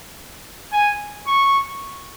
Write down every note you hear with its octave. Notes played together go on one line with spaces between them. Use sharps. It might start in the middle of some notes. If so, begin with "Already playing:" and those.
G#5
C#6